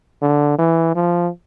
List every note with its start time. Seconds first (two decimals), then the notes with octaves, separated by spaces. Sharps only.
0.22 D3
0.58 E3
0.95 F3